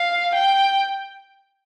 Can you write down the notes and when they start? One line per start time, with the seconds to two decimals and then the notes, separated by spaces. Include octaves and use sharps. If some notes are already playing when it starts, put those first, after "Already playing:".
Already playing: F5
0.35 G5